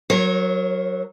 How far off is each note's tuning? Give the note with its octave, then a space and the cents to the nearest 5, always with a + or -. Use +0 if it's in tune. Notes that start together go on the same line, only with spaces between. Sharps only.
F#3 +0 A#4 +0 C#5 -40